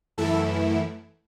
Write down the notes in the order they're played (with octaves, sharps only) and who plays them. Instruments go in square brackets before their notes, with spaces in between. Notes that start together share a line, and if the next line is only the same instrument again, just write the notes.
[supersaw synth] F#2 E3 A3 E4 A4